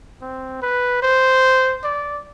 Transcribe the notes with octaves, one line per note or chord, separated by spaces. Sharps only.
C4
B4
C5
D5